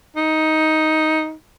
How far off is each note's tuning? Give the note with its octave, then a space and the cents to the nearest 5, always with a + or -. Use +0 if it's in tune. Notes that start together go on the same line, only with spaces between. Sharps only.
D#4 +10